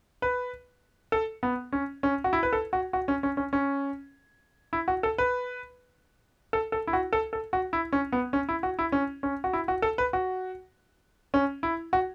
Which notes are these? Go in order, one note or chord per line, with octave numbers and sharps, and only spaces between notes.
B4
A4
B3
C#4
C#4
F#4
E4
B4
A4
F#4
F#4
C#4
C#4
C#4
C#4
E4
F#4
A4
B4
A4
A4
E4
F#4
A4
A4
F#4
E4
C#4
B3
C#4
E4
F#4
E4
C#4
C#4
F#4
E4
F#4
A4
B4
F#4
C#4
E4
F#4